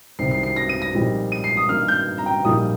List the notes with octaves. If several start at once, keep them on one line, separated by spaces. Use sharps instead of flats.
C2 C3 D#3 G3 C4 C7
C7
C7
A#6
D#7
A#6
A#1 A#2 G3 C4 D#4
D#7
C7
D#6
G2 D#3 A#3 D#4 F6
G6
A#5
G5
A#1 A#2 G3 A#3 D#4 D#6